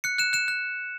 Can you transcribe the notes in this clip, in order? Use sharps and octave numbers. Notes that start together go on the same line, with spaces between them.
F#6 C#7
F#6 E7
F#6 E7
F#6